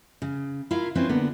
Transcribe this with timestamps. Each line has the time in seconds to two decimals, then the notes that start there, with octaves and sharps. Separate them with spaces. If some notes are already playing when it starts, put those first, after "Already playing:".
0.22 C#3
0.71 E4 F4 A#4 F5
0.95 C4 C#4 E4 F4 B4 C5
1.09 D3 A#3 B3